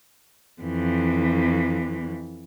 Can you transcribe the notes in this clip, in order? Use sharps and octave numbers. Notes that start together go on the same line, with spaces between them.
F2 E3